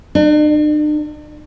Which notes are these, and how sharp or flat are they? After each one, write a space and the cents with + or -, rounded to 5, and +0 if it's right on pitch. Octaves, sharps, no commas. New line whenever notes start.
D4 +45